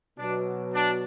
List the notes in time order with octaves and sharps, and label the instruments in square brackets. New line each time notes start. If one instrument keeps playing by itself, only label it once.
[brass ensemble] B2 F#3 D4
D4